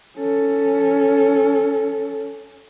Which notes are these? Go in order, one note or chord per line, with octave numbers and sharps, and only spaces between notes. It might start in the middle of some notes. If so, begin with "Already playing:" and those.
C#4 A4